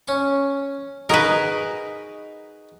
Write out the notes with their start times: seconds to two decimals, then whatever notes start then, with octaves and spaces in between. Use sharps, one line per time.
0.08 C#4 C#6
1.09 D#4 F#4 G#4 A#4 B4